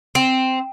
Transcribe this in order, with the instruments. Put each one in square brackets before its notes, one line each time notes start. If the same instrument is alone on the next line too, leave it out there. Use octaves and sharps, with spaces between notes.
[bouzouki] C4